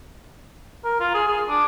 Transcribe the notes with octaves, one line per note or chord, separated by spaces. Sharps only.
A#4
F4
G#4
G#4
D4